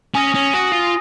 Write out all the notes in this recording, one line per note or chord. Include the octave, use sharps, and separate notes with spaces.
C#4 G#5 D#6 A#6 D#7
C#4
F#4 G#5 D#6 A#6 D#7
F4